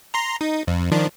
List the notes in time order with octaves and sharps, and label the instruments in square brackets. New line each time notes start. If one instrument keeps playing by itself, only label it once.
[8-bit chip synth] A#5 C6
D#4
F2
D#3 F3 D4